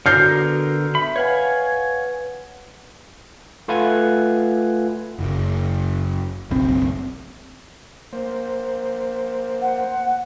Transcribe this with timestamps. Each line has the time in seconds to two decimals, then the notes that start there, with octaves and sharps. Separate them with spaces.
0.06 D3 B3 F#4 A#4 F6 G6 C7
0.95 E5 B5
1.16 B4 C#5 F5 F#5 G#5
3.68 A3 F4 B4 F#5 G#5 G#6
5.19 F#1
6.50 F#1 B1 C4
8.13 A#3 C5
9.62 F#5